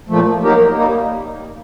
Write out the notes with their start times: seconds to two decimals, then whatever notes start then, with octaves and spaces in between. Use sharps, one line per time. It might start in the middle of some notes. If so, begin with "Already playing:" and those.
0.09 A#2 F3 A3
0.42 F#3 A#3 D#4 G4 A#4
0.75 G3 A#3 D#4